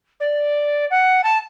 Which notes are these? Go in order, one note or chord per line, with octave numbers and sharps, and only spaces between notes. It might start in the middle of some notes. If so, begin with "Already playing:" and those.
D5
F#5
A5